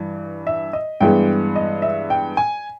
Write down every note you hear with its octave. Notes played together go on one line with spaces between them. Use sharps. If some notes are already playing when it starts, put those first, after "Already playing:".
Already playing: G2 E3
E5
D#5
G2 E3 G#3 B3 G5
D#5
E5
G5
G#5